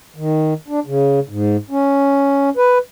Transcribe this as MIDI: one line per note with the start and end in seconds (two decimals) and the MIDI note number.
0.16 0.54 51
0.68 0.80 62
0.86 1.20 49
1.29 1.57 44
1.70 2.50 61
2.57 2.78 71